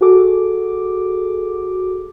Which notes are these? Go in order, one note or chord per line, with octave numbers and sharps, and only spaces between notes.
F#4 G#4 A4 D6